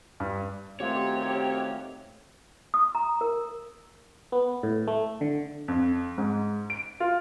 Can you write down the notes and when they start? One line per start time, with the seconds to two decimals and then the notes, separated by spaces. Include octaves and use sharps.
0.20 G2
0.80 F#2 D#3 A3 C4 F4 G4 C#5
2.74 D#6
2.95 A#5
3.21 A#4
4.32 B3
4.63 A2
4.87 A3
5.21 D3
5.68 F2
6.18 G#2
6.70 D7
7.00 F4